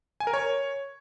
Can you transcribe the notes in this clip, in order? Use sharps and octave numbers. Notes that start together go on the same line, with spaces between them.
G#5
A#4
C#5